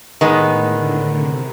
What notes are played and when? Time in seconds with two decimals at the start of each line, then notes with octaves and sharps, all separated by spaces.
0.20 A2 D#3 G#3 B3
0.69 D3
1.18 C3